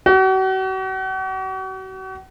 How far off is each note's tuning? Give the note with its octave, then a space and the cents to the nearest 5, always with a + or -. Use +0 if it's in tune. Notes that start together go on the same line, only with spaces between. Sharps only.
F#4 +40